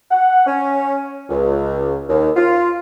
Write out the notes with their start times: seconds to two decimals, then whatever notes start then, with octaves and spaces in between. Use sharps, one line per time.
0.11 F#5
0.46 C#4
1.30 C#2
2.09 D#2
2.36 F4